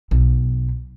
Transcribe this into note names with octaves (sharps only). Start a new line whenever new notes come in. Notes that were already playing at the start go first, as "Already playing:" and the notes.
B1